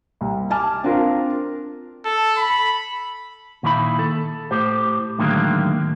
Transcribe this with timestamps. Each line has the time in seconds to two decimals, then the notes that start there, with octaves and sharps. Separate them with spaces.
0.21 C2
0.50 G#5 A5 D6 F6
0.83 C4 D4 F4 A#4
2.05 A4
2.37 B5
3.63 A#2 D#3 E4 A#4 B5
3.99 A4
4.51 A2 G4 C5
5.19 A2 D3 D#3 F#3 G#3 A#3